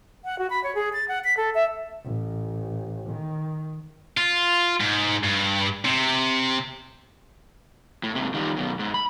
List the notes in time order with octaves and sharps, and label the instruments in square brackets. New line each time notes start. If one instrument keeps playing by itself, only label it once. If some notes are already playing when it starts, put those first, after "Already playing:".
[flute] F#5
F#4
B5
C#5
G#4
A6
F#5
B6
A4
E5
[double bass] A1
D#3
[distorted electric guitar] F4
G#2
G2
C3
[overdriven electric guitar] A2
G#2 C3
D#3 G3
F#2 B2
G#2
B5